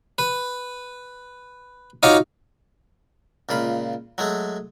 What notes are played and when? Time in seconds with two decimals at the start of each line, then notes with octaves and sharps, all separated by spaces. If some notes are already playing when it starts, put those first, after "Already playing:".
0.18 B4
2.03 D#4 F4 F#4 C#5 D#5 D6
3.49 C#2 A#2 F4 B5
4.18 F#3 G#3 A3